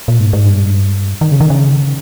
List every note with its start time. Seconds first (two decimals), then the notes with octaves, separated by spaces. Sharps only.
0.08 A#2
0.20 G#2
0.33 G#2
0.45 G2
1.21 D#3
1.32 C#3
1.41 D#3
1.50 C#3